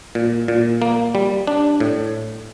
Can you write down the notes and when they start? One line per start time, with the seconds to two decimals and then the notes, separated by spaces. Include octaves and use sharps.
0.15 A#2
0.48 A#2
0.82 A#3
1.15 G3
1.47 D4
1.80 A2